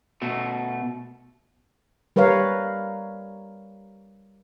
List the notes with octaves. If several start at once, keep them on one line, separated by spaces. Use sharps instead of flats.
B2 A3
G3 A#4 B4 C#5 F5